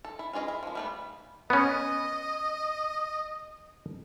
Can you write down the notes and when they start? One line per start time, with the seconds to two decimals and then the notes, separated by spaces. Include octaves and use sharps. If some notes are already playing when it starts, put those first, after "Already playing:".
0.05 A4
0.19 E4
0.33 C#4 F4 G#4 D5 D#5
0.48 E4
0.63 F3 A#3
0.75 G3 A3 B3
1.50 B3 C#4 D#5